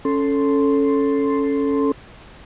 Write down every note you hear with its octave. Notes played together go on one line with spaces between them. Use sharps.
C#4 A4 C6